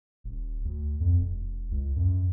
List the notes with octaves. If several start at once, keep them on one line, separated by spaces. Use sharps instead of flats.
D#1
D2
F2
E1
C#2
F#2